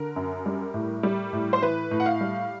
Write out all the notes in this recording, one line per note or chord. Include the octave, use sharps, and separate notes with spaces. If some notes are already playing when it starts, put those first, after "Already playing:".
Already playing: D3 A#4
F#2
G3
A2
G3
A2
C5
E3 B4
A2
F#5
F5
G3